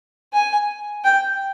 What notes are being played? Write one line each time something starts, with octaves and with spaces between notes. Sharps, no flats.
G#5
G5